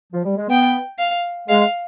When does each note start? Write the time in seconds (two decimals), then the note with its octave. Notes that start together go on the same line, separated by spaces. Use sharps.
0.13 F3
0.25 G3
0.37 G#3
0.50 B3 G5
0.99 F5
1.49 G#3 F5